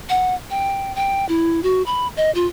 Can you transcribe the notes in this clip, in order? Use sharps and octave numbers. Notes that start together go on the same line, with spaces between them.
F#5
G5
G5
E4
F#4
B5
D#5
F4